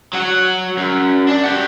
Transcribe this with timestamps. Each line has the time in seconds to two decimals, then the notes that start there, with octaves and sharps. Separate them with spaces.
0.13 F#3 F#4
0.77 F#2
1.28 D4
1.44 G4 F#5